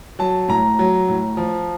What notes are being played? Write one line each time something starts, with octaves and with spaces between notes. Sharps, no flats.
F#3 A5
A2 A#5
F#3
A2
F3